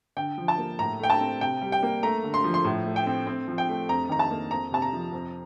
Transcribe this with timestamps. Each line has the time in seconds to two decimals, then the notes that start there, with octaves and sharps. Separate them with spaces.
0.17 D3 G5
0.38 F3
0.48 A5
0.58 A#3
0.79 A2 A#5
0.99 A3 G5
1.10 A5
1.20 C4
1.41 C3 G5
1.62 G3
1.72 G5
1.83 A#3
2.03 A3 A#5
2.24 D3
2.34 C6
2.44 F3
2.54 C6
2.64 A2
2.86 A3
2.96 G5
3.06 C4
3.27 C4
3.48 F3
3.58 G5
3.68 A3
3.89 F2 A#5
4.09 D#3 A#5
4.19 A5
4.31 A#3
4.51 F2 A#5
4.72 C3 A5
4.82 A#5
4.93 F3
5.12 F2